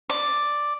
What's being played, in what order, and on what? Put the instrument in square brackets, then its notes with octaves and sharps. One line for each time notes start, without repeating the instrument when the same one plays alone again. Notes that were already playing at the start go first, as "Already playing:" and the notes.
[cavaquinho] D5